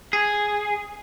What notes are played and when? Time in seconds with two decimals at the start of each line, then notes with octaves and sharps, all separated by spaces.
0.13 G#4